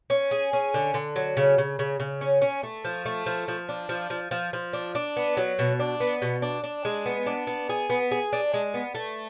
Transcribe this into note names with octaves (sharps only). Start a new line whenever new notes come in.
C#4
G#4
C#4
D3
D3
F#3
C#3
C#3
C#3
C#3
C#4
C#4
A3
F3
A3
F3
F3
D4
F3
F3
F3
F3
D4
D4
B3
F#3
B2
D4
B3
B2
D4
D4
G#3
B3
D4
B3
G#4
B3
G#4
D4
G#3
B3
A3